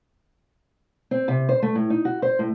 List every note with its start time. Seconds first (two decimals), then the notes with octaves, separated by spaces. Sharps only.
1.11 C4
1.28 C3
1.49 C5
1.63 A3
1.75 A2
1.90 D#4
2.05 F#4
2.22 C5
2.39 A2